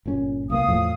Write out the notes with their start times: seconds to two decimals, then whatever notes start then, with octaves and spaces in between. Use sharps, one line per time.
0.06 G1 A#2 C#4
0.50 C2 A#3 B3 F5 D#6
0.68 E2 A2 F3